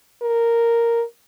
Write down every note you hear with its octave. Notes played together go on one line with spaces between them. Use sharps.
A#4